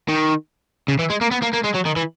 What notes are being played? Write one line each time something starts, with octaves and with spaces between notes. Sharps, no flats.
D#3
C#3
E3
G#3
A#3
B3
A#3
A#3
G#3
F#3
D#3
E3